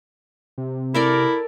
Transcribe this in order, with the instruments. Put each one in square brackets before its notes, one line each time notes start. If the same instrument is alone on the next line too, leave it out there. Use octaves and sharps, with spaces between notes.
[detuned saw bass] C3
[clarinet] E4 [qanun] A4 A#4 D5